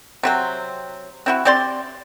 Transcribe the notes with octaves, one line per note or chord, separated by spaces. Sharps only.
C3 F#3 C4
C4 E4 F#4
C4 G4 D5 C6